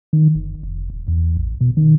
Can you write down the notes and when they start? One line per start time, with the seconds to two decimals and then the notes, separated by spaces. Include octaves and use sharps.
0.13 D#3
0.35 F#1
0.63 F1
0.90 D#1
1.08 E2
1.37 A1
1.61 B2
1.77 D#3